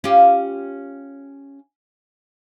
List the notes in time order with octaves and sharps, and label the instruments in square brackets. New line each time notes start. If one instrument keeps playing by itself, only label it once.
[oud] C#4 F4 G4